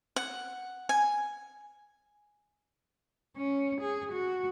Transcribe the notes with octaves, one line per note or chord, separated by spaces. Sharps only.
F#5
G#5
C#4
G#4
F#4